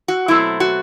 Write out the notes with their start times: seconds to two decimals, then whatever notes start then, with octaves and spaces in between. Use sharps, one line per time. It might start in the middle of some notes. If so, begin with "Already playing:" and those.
0.08 F#4
0.28 B2 F#3 A3 C4 E4
0.60 F#4